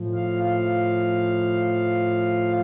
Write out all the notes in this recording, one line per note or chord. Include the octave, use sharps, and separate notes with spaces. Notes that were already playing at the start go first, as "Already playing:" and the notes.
Already playing: A2 F3
F5
F5